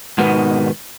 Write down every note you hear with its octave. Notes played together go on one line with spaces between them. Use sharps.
G#2 B2 D#3 B3